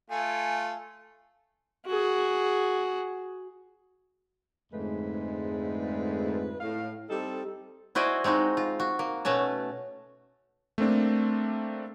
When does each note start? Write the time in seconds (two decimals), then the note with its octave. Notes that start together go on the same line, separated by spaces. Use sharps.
0.10 A3 F4 G#5
1.86 F#4 G#4
4.73 F2 G#2 D3 G#3 A3 B4
6.60 A2 F5
7.09 G3 C4 D#4 A4
7.95 E4 F#4 C5 D5 D#5 G#5
8.24 G#3 C4 D#4 F#4
8.57 F4
8.80 F#4
8.99 A#3
9.25 B2 A3 C#4 F#4 A5
10.78 A3 A#3 C4 D4